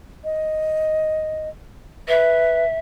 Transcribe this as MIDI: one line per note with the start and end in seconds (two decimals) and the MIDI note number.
0.24 1.49 75
2.08 2.64 71
2.08 2.78 76